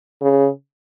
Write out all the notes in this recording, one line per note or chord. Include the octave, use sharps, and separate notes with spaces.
C#3